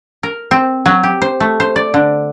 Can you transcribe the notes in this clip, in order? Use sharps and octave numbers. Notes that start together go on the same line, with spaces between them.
A#4
C4
F#3
G4
C5
A3
C5
D5
D3